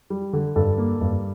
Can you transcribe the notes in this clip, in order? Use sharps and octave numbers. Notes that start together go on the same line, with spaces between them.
G3
D3
G2 A4
A#3
G2